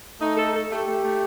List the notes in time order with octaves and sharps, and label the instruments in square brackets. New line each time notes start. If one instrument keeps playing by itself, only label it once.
[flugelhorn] A3 [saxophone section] D#4
[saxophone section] A4
A4
[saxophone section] A3 [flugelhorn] G4
[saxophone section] A3
A3